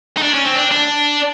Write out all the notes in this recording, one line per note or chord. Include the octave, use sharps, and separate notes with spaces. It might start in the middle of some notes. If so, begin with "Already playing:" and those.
D#4
D4
C#4
C4
D4
D4